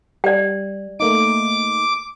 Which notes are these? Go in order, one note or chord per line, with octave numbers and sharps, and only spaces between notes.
G3 D5 G5
A3 A#3 D#4 D6